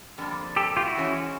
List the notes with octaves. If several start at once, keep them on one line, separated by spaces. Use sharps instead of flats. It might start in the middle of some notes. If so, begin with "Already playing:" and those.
F2 D3 G3 A#3
G4 A4
F4 G4
E4 F#4
G#2 E3 G#3 C#4